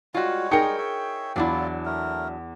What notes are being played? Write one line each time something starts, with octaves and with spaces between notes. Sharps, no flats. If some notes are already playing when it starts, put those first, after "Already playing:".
G3 G#3 F4 F#4 C#5
D#4 G#4 A#4 G5 C#7
C#5 E5
E2 F#3 D4 E4 F4 D5
A3 A#4